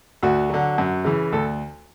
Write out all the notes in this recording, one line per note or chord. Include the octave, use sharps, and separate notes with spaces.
D2 F#4
D3 F#3
F#2
C#3 E3
D2 A4